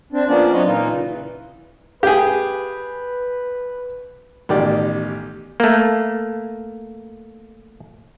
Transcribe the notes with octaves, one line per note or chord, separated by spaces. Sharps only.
C4 D4
F3 A#3 B3 C#4 D4 D5
F#3 C4 B4 C#5 D#5
A#2 E3 A#3 D#4 F4
A#2 C#3
E3
G4 G#4 B4
A1 B2 D#3 G4 D5
A3 A#3